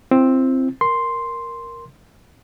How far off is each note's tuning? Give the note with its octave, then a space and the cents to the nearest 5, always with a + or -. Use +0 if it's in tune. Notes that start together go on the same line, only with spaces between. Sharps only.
C4 +5 E4 +40
A#4 +0 C6 +0